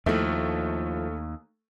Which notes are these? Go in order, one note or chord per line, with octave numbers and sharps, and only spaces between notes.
D#2 F3 A3 E4